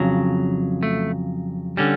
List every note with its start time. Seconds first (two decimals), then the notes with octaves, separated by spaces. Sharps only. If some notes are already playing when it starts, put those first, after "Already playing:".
Already playing: F2 C#3 F#3
0.83 A3
1.77 D3 G3 C#4